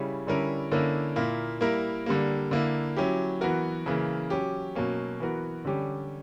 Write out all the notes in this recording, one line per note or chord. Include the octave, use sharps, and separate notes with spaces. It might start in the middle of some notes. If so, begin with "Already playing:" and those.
Already playing: C#3 G3 C#4 E4
D3 G3 C#4 E4 A#4
D3 A#3 C#4 E4 A#4
A#2 A#3 E4
G3 A#3 E4 A#4
D3 G3 A#3
D3 A#3 E4
F#3 C#4 E4 G4
E3 B3 F#4 A#4
C#3 E3 A#3
F#3 C#4 G4
B2 F#3 A#3 C#4
E3 B3 F#4 A#4
D3 G3 C#4 G4